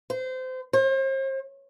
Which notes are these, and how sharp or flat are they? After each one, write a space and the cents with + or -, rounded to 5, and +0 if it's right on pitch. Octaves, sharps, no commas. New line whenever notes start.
C5 -25
C5 +40